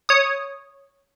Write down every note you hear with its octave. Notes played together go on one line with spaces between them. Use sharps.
C#5 D#6